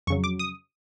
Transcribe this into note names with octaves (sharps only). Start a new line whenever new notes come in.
F2 C#3 F#3 C#6
D6
D#6